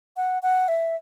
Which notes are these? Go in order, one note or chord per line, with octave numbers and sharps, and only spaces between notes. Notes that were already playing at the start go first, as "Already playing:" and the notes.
F#5
F#5
E5